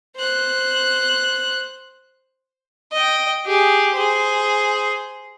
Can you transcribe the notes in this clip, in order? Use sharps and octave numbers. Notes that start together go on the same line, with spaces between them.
C5 F#6
D#5 G5
G4 G#4
G#4 C5